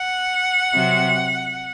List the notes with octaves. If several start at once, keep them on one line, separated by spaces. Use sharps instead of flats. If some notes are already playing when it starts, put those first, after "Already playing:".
Already playing: F#5
C3 F#3 C4